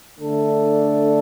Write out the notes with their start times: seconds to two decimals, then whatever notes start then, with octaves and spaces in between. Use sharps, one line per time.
0.18 D3 A3 D4 A4